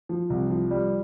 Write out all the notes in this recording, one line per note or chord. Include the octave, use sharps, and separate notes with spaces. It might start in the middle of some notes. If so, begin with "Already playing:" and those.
F3
C2
F3
G3